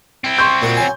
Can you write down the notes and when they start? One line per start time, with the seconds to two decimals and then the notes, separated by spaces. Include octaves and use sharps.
0.24 C4 E4
0.39 C6 C#6 G6
0.62 A#2 F#4
0.77 F#3 G#5